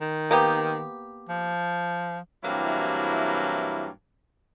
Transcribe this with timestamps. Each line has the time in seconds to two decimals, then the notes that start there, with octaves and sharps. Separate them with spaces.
0.01 D#3
0.31 A#3 B3 G4
1.29 F3
2.45 G2 C3 E3 F#3 A#3 E4